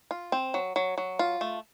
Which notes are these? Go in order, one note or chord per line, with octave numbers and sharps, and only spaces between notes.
F4
C4
F#3
F#3
F#3
F4
A3